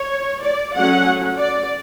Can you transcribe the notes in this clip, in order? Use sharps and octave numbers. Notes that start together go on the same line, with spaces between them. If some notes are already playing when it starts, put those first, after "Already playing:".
Already playing: C#5
D5
F#3 A3 C#4 F#5
D5